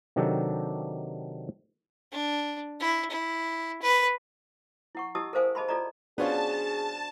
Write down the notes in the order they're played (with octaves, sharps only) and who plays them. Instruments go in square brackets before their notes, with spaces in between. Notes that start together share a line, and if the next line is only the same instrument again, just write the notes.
[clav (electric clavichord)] C3 D#3 F#3 D4 G4 A4
[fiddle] D4
E4
E4
B4
[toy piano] E4 F#5 C#6
E4 G4 D#5 A5 D#6 E6
A4 A#4 C5 F5 G#5
G#4 D#5 A5 B5 C6
F4 A4 D5 D#5 A#5
[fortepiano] B3 C#4 F4 [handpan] D4 F#4 C5 [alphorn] G#4 [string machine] A5